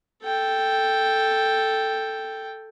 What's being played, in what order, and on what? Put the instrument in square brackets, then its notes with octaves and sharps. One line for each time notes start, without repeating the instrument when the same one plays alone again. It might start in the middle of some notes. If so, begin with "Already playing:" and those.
[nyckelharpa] A4 G5